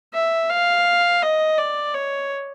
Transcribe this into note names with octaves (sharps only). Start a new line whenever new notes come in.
E5
F5
D#5
D5
C#5